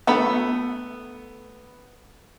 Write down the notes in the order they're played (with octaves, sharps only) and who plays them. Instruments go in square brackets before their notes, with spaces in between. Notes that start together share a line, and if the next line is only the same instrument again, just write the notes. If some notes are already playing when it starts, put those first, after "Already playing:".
[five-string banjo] A3 A4 B5 [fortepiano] B3